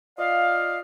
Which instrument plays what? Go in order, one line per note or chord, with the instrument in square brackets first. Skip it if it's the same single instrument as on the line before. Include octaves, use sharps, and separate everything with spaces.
[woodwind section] F4 D5 D#5 F5